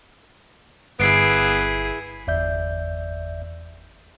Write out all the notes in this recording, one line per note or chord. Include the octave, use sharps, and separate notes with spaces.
G1 B3 E4 G#4 C7 D7
G1 E2 D5 E5 G6